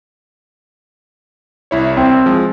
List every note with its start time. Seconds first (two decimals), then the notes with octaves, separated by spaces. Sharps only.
1.71 C2 E4 C#5
1.97 C4
2.26 F3 G#3